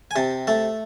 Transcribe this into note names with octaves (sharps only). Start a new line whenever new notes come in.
G#5
C3 A5
A3 A5